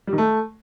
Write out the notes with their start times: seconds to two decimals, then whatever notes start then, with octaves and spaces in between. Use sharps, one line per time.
0.07 G3
0.13 D#3
0.18 A3